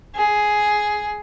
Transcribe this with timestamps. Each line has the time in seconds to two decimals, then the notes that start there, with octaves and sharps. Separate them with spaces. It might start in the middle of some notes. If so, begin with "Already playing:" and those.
0.15 G#4